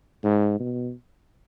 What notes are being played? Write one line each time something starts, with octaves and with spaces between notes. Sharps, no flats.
G#2
B2